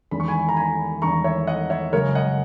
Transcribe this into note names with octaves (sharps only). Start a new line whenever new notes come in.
E2 D#3 G#3 B5
C#6
G#5 B5
A#5
G#5 B5
E2 D#3 G#3 A#5 C#6
C#5 E5
D#5 F#5
C#5 E5
F#1 F#2 C#3 G#3 A#4 C#5
D#5 F#5